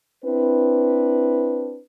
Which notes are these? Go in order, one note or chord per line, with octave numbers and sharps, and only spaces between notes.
C4 D4 E4 B4